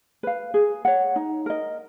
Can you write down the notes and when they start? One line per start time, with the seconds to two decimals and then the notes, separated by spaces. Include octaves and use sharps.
0.23 B4 F5
0.54 G#4
0.85 C#5 F#5
1.16 D#4
1.46 A#4 D#5